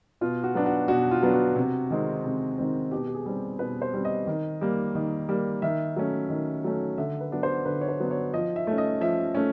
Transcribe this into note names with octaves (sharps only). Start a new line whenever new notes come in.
B2 F4
F#4
F#3 B3 D4
F#4
B2 F#4
F4
F#3 B3 D4
F#4
C3
D#3 G#3 C4
C3
D#3 G#3 C4
B2 G4
G4
G#4
G3 C4
B2 B4
C5
G3 C4
D#5
D#3
G3 A#3
D#3
G3 A#3
D#3 E5
F#3 A3 C#4
D#3
F#3 A3 C#4
D3 E5
B4
F#3 B3 D4
C5
D3 B4
C#5
C5
F#3 B3 D4
C#5
F3 D#5
E5
A3 C#4
D#5
F3 E5
A3 C#4